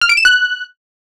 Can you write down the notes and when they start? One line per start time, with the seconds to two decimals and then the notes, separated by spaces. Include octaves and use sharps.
0.01 F6
0.09 D7
0.17 E7
0.25 F#6